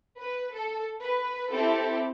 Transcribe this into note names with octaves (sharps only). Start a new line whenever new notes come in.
B4
A4
B4
C4 E4 G4 A4